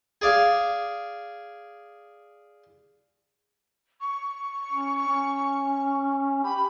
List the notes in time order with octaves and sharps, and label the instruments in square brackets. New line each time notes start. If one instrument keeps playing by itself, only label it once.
[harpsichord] G#4 D5 F5
[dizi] C#6
[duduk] C#4
C#4
[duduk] G4 [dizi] B5